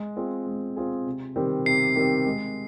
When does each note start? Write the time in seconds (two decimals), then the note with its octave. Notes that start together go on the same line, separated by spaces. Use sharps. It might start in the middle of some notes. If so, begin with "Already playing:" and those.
Already playing: G#3
0.17 C4 F4 G#4
0.47 G#3
0.76 C4 F4 G#4
1.06 C3
1.36 D#3 G3 C4 G4
1.66 C3 C7
1.96 D#3 G3 C4 G4
2.26 G#3